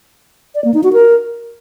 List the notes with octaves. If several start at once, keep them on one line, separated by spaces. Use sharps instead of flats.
D5
A#3
D#4
F#4
A#4